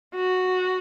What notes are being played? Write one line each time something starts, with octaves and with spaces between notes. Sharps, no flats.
F#4